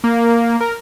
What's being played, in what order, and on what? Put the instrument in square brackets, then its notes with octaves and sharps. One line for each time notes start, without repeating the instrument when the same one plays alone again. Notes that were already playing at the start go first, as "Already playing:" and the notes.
[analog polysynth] A#3
A#4